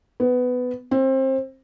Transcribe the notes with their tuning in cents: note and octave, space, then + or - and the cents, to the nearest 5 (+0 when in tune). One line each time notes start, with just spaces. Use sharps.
B3 +15
C4 +25